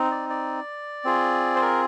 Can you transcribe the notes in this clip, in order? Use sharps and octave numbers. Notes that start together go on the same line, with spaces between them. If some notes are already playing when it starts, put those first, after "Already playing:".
Already playing: C4 D#4
D5
D5
C4 F4 G#4
C5
A#4